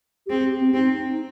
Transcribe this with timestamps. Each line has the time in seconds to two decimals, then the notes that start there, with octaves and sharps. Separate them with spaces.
0.26 G4
0.30 C4 G#4
0.45 G4
0.60 C4
0.74 C4 D#4
1.08 D#4